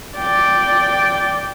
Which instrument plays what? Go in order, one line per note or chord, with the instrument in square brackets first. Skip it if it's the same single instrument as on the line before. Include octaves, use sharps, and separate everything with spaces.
[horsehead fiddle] D5 G5